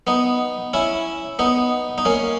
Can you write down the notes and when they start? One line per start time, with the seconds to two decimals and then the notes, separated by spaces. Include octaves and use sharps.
0.07 B3 D#4
0.73 C#4 E4
1.39 B3 D#4
1.98 D#4
2.05 A#3 C#4